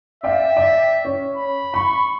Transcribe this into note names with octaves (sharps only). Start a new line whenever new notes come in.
D5 E5 F5 G5
D5 G5
C#4
B5
B5 C#6